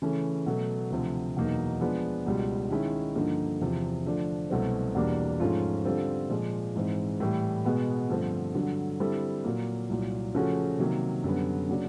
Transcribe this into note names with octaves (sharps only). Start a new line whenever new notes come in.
C#3 E3 A3 C#4
B2 F#3 A3
D2 C3 F3
E2 B2 F#3 A#3 D#4
F3 G#3 B3 D4
C#2 B2 G3
D#3 G#3 C#4 E4
G2 D3 F3 A#3 D#4
E2 C3 F3
D3 F3 A3 D4
C2 B2 F#3 A3 C4
E2 B2 G3 A#3 D4
G#2 F3 A3 C#4 F4
D3 G3 C4 F4 A4
A#2 F3 G#3
G#2 E3 G#3 C4
A2 E3 G3
B2 G#3 B3
G2 D3 F3 A3 C4
G2 D3 F#3
D3 G3 C4 E4 A4
A#2 F#3 A#3
C2 A#2 F#3
C#3 F3 A3 C#4 F#4
C3 D#3 F#3 A#3
F#2 D3 G3 B3
C#3 F#3 A#3 D4